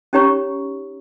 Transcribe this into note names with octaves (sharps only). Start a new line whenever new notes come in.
C#4 D#4 G4 C#5 A#5 C#6